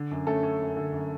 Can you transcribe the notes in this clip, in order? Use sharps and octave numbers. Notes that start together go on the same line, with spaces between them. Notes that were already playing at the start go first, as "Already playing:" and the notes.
Already playing: D3
F#2
A3 C#4 A4
C#4
F#2
D3
F#2